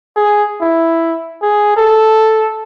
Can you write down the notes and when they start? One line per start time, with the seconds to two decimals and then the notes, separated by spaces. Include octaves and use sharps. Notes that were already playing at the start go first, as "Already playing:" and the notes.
0.17 G#4
0.61 E4
1.42 G#4
1.77 A4